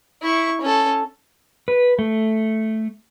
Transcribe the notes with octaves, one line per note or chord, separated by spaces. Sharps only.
E4 C#6
C#4 A4
B4
A3